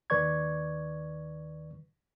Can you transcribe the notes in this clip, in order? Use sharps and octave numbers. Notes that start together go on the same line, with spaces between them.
D#2 D#3 B4 D5 C#6 G#6